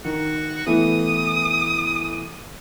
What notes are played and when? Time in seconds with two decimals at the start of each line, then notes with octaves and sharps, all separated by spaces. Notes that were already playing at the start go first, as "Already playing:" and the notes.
0.05 D#3 F#4
0.67 E3 A3 B3 D#6